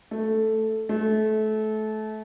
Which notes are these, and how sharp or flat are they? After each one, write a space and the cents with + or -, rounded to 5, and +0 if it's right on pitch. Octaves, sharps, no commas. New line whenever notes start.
A3 +0
A3 -25